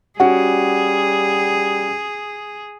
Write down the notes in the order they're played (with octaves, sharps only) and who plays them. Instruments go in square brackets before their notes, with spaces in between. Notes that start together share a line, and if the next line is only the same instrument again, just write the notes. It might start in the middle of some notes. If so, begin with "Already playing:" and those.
[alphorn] G3 [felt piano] C#4 F#4 [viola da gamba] G#4 [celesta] F#5